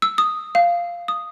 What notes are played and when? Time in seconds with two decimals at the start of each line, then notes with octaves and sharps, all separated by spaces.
0.02 E6
0.18 D#6
0.55 F5
1.08 D#6